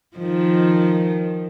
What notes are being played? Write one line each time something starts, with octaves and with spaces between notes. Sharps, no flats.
D#3 F3